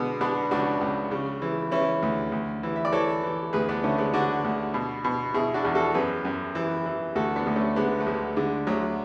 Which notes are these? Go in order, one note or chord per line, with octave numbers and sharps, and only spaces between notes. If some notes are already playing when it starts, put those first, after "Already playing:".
Already playing: B2 D3 G#3 B3
B2 B3 D4
C#2 D4 F#4
C#2
C#3
E3
E3 C#4 E4
D2
D2
E3
E5
D5
E3 A4 C#5
E3
D2 G#4 B4
B3 D4
D3 A3 C#4
G#3 B3
D3 D4 F#4
D2
B2
B2
B2 E4 G#4
D4 F#4
E2
F#4 A4
F#2 G#4 B4
F#2
E3
E3
D2 F#4 A4
B3 D4
D2
A3 C#4
D3 G#3 B3
A3
D2 G#3
D3 G#3
D2 F#3